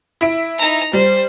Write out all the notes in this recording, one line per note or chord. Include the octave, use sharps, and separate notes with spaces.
E4 E5 D7
D#4 A#5
G3 C5